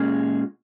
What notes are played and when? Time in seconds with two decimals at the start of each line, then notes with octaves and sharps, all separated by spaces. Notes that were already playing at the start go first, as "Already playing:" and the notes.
Already playing: A#2 G#3 C#4 G#4